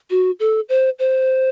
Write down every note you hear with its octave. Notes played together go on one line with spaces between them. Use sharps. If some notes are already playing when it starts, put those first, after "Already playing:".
F#4
A4
C5
C5